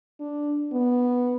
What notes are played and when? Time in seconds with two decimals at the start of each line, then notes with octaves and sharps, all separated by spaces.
0.20 D4
0.73 B3